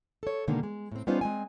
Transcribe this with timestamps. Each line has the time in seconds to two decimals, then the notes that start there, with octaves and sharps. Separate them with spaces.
0.23 A4 C#5
0.48 B2 D3 D#3 G#3 A#3
0.63 G#3
0.92 A2 C4
1.07 G3 B3 C#4 D#4 F4 C5
1.21 G#3 C4 G#5